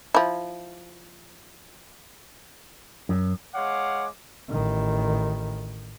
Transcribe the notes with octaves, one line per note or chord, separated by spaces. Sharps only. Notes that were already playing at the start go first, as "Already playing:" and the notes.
F3 E4
F#2
G#3 C#5 F5 F#5 D6
A1 D#3